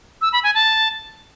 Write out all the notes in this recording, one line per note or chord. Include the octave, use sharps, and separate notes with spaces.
E6
B5
G#5
A5